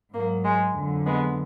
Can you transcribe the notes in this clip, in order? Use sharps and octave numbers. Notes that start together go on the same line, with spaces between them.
G#2 F#3 A#3
G#3
F2 D3 F#3
G#3 B3